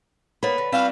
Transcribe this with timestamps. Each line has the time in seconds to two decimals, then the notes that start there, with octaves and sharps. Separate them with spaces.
0.43 A#3 B3 B4 C#5 B5
0.58 D3
0.72 G3 C4 E4 F#4 F5 B6 E7